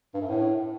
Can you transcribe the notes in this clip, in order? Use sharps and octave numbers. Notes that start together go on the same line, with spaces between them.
G2
F#2
A2